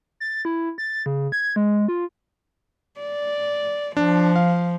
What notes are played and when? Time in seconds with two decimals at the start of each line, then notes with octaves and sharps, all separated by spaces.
0.20 A6
0.45 E4
0.78 A6
1.06 C#3
1.32 G#6
1.56 G#3
1.88 F4
3.00 D5
3.97 F3 D4
4.36 F5